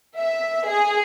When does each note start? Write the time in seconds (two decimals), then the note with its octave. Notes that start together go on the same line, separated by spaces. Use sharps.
0.18 E5
0.67 G#4